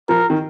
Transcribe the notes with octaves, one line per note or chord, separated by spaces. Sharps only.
F3 A#4
D#3